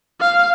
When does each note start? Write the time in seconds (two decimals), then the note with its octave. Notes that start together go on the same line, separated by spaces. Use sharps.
0.21 F5